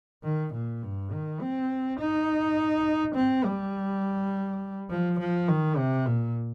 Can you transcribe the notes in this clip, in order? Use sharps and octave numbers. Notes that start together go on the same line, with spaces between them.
D#3
A#2
G2
D#3
C4
D#4
C4
G3
F3
F3
D#3
C3
A#2